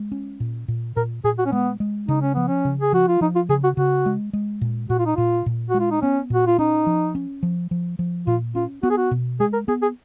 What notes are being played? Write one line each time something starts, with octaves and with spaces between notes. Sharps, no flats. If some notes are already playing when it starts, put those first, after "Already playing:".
Already playing: G#3
C#4
A#2
A#2
A#2 A#4
A#2 G#4
F#4
C#4
G#3 B3
G#3
C#3 D#4
C#4
F3 B3
C#4
C#3
G#4
F3 F#4
F4
F3 D#4
F4
C#3 G#4
F#4
C#3 F#4
G#3
G#3
A#2
A#2 F#4
F4
D#4
A#2 F4
A#2
G#3 F#4
F4
D#4
B3 C#4
A#2 F#4
F4
C#4 D#4
F3
C#4
F3
F3
F3
A#2 F4
C#4 F4
B3 F#4
G#4
F#4
B2
G#3 G#4
A#4
B3 G#4
G#4